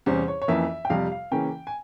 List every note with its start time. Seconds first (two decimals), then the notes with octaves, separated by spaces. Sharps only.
0.06 E2 C3 G3 C#4 C5
0.28 C#5
0.42 C#5
0.48 F2 E3 A#3 C#4 E5
0.85 G5
0.90 F2 C3 G3 F5
1.12 F5
1.32 C#3 E3 A#3 C#4 G5
1.67 G#5